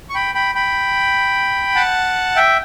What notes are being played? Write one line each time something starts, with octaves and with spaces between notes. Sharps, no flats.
C#6
G5 B5
G5 B5
G5 B5
F#5 A5
E5 G5